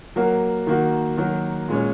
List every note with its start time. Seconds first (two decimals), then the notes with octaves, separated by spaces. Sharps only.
0.16 F#3 A#3 F#4 A#4
0.67 D#3 A#3 F#4
1.17 D#3 F#3 A#3 F#4 A#4
1.68 A#2 G#3 C#4